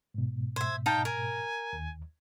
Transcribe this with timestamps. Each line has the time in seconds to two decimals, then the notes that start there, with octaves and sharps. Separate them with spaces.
0.14 G#2 B2
0.56 C5 E5 G#6
0.86 D#4 F5 G5 A5
1.05 A#4 G#5
1.73 D#2